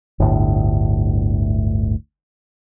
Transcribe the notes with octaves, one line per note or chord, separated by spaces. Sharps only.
G1 D2 A2